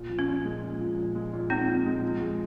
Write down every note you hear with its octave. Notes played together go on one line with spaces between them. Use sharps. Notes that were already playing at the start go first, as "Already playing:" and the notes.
Already playing: A#2
F3
C#4
A#2
G#3
A#2
F3
A#2
G#3
A#2
F3 C4 D#4
A#2
G#3
F3
G#3